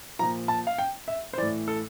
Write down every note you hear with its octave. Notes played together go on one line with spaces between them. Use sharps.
A#2 F3 A#5
A5
F5
G5
E5
C5
A2 E3 D5
A4